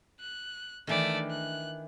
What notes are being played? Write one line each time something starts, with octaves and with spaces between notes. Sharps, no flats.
F#6
D#3 E3 A3 D4 D5
F#6